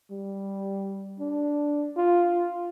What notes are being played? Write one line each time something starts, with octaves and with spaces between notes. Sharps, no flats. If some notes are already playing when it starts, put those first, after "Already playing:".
G3
D4
F4